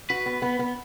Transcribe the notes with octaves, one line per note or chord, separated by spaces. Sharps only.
F#4 B4
B3
B3
B3